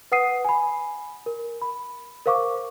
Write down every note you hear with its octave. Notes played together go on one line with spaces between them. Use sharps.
B4 F#5 D#6 C7 D#7
G#5 B5
A#4
B5
A#4 C5 F5 C#6 D6